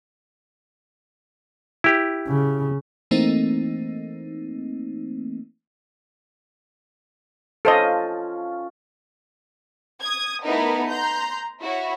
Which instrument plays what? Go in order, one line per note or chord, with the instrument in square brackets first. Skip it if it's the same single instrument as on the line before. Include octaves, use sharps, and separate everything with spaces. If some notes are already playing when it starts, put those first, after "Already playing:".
[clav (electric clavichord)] E4 G4
[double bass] C#3
[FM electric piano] E3 A3 A#3 C4 D#4
[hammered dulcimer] F3 C#4 F4 [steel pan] A4 C5 D#5
[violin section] D#6 G#6
A3 B3 D#4 E4 A#4 B4
A#5 C6 G6
E4 F#4 C#5